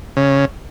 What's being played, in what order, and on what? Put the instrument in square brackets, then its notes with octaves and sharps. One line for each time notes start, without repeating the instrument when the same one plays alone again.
[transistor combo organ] C#3